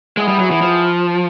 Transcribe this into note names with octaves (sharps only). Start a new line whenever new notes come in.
G#3 B3 E4 G#4
G3
F#3
E3
F3